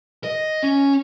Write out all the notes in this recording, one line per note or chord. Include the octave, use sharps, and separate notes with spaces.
D#5
C#4